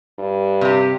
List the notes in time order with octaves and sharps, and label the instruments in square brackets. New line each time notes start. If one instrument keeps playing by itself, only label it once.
[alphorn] G2
[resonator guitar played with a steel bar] C3 G4